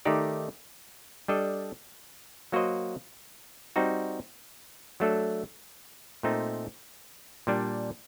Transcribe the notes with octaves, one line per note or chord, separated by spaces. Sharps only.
D#3 A3 D#4 G4 D5
G3 D4 A4 D#5
F#3 A#3 F#4 C5 D#5
G3 C4 D#4 F#4
F#3 A3 D4 A4
A#2 A3 C4 D#4
A#2 G3 D4